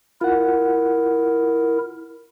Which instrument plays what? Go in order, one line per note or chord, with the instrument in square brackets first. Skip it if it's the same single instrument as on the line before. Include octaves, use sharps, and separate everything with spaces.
[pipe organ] E4 A#4 [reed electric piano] F4 F#5